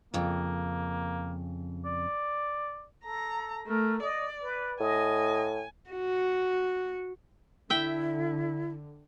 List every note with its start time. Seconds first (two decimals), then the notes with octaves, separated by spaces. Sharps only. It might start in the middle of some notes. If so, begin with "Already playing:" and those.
0.14 F2 C#3 A#3
1.85 D5
3.05 A4 A#5
3.67 A3 A#4
4.02 D5 D#5
4.43 B4
4.80 A2 D#5 G#5
5.90 F#4
7.70 D3 E4 E5 G5